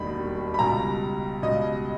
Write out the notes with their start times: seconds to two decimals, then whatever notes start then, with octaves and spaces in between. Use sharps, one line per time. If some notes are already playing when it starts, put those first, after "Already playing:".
Already playing: E1 D#2 D#3 G3 B5
0.54 B5
0.59 C#2 B2 G3 A#5
1.42 C#2 B2 G3 D#5